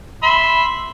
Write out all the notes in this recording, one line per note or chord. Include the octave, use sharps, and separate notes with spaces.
E5 B5 C6